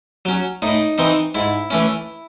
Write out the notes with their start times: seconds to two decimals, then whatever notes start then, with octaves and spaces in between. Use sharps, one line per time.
0.25 F#3 C#4
0.62 A2 D#4
0.98 E3 C4 D#4
1.35 G#2 E4
1.70 E3 A3 C#4